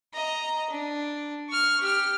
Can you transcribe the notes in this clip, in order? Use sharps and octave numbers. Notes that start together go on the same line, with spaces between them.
D#5 A#5
D4
C#6 F6
G4 F6